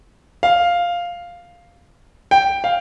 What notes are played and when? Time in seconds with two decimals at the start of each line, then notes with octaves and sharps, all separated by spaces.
0.43 F5
2.31 G5
2.64 F5